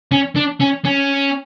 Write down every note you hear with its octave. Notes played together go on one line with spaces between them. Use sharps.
C#4
D4
C#4
C#4